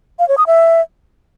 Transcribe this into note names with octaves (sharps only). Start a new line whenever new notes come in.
F5
C#5
D#6
E5